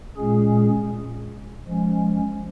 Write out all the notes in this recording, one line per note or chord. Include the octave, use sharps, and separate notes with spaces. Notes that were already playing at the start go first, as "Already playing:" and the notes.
A#2 G#3 C#4 G#4
F3 G#3 C#4